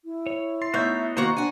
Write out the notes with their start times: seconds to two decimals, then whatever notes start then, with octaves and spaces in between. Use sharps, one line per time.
0.05 E4
0.27 C#5
0.62 C6 A6 C7
0.74 A3 B3 D#4 F#4 C#5 E5 G6
1.17 D#3 A#3 F#4 C5 A#5 C#6
1.37 D4 F#5 G#5